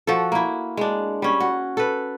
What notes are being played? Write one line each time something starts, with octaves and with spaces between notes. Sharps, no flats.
F3 F#4 A4
A#3 E4
G#3 D4
G3 C#4
F#4
A4 B4